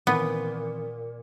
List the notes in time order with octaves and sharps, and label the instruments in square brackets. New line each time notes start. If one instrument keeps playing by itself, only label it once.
[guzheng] A#2 [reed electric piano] D#3 E3 C4 [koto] B3